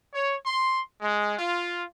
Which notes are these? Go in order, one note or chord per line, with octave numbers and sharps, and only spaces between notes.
C#5
C6
G#3
F4